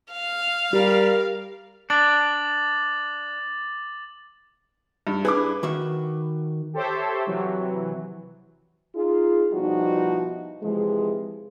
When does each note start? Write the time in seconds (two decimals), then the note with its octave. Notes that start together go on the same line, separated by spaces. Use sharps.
0.12 F5
0.73 G3 G4 A#4
1.90 D4 D6 A6 F#7
5.07 G2
5.25 D4 E4 G#4 B4 D6
5.63 D#3 F#4 E5
6.73 G4 A4 C5 C#5 E5
7.27 C3 E3 F#3
8.96 D#4 F4 G#4
9.52 B2 F3 G3 D#4 E4 F#4
10.62 C3 E3 F3 G#3